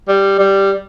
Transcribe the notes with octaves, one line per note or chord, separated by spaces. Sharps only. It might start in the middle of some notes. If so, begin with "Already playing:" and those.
G3
G3